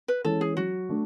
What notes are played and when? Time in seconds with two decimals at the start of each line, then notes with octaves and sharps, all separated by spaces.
0.08 B4
0.24 E3 G#3 C#4 A4
0.41 G#4
0.57 F#3 F#4
0.89 A3 D4